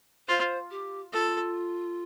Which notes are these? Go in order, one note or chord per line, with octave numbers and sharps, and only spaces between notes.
F4 C5
G4
F4 A4